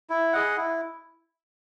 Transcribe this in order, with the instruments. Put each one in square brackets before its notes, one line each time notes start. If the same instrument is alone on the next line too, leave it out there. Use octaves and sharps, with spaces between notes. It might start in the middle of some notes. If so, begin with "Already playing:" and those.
[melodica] E4
G#4 D#5 F#5
E4